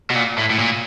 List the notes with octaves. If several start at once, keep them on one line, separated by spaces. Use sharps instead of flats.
B2
A#2
A2
A2
A#2